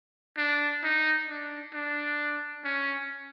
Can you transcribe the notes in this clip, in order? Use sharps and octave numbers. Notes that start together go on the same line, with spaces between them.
D4
D#4
D4
D4
C#4